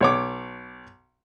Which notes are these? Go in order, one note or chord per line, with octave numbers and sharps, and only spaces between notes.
B1 C#5 D6